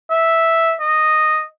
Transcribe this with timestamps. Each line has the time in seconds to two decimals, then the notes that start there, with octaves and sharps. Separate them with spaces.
0.10 E5
0.80 D#5